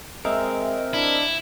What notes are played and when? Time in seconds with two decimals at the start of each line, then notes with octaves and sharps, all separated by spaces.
0.25 G#3 C4 A#4 D#5 E5
0.93 D4 E4